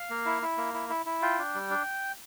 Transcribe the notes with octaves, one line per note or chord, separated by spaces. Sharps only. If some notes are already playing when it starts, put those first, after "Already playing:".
Already playing: F5
A#3
E4
E4
A#3
E4
E4
E4
F4 G5
D4
G3
D4